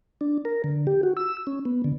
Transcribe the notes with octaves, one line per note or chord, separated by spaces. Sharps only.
D4
A#4
D3
G4
F#4
E6
C#4
B3
D3